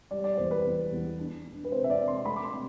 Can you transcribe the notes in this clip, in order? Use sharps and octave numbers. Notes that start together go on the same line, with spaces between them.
G3 D5
D5
E2 C5
B4
E2
E2
D4
D4
B4
C3 C5
E5
D5
C3
C6
A3 B5
D6
C6
C3